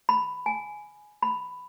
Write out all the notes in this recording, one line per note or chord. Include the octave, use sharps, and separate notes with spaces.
B5
G#5
B5